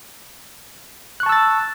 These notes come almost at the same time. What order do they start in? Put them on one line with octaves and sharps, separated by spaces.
F#6 C#6 A5 E6 A6